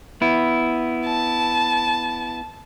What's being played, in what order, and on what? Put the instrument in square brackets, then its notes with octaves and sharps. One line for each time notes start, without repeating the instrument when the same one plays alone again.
[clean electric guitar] B3 E4
[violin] A5